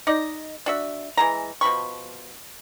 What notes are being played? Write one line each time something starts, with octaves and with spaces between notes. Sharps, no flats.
D#4 D5 D#5
D4 F#4 E5
E3 G#3 A#5
B2 F3 B5 C#6